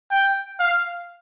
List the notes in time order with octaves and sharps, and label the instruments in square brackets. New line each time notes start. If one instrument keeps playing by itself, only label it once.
[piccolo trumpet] G5
F5